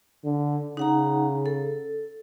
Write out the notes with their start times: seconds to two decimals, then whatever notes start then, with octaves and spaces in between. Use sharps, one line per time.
0.24 D3
0.77 C#3 D#4 F#5 A#5
1.46 A4